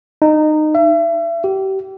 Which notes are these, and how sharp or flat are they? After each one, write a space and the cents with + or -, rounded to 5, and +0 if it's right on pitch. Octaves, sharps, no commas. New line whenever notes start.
D#4 -20
E5 +35
G4 -30